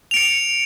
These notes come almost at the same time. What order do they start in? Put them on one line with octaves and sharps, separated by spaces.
F7 D7 C#7